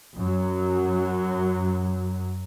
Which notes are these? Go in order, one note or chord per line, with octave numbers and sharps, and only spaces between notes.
F#2 F#3